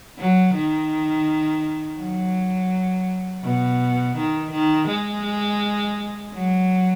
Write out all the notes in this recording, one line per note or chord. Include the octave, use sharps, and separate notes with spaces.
F#3
D#3
F#3
B2
D#3
D#3
G#3
F#3